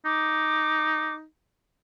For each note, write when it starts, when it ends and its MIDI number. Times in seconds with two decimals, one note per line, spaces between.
0.05 1.25 63
0.05 1.14 86